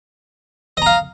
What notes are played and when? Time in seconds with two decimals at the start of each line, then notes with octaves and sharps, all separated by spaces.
0.77 D#5
0.82 A#5
0.86 F5